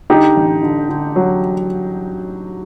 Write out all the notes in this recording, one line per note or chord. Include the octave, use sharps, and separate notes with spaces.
D3 D#4 G4
A1
D3
D3
F#3